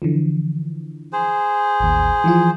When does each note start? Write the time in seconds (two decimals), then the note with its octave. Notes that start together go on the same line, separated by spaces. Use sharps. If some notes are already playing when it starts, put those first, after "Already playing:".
0.02 D3 E3 F3
1.13 G#4 C5
1.80 A1 D#2
2.24 E3 F3 F4